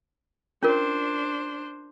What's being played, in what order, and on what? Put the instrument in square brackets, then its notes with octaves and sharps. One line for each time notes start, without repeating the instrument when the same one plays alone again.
[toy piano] C#4 F4 A#4 [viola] D4 C5